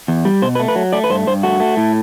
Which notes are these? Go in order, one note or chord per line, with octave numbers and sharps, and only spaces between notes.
E2
G3
B2 C5
B4
A3
B4
F#3
A3 D5
B4
G2 C5
G2 C5
A3 F#4
A3
A2